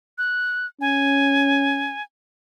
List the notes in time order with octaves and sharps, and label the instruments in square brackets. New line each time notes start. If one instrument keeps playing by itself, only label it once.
[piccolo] F#6
[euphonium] C#4 [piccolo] G#5